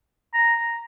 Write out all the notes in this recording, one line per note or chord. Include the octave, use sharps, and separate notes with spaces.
A#5